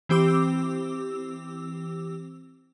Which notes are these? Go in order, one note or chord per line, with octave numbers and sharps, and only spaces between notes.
E3 C4 G4 D6 E6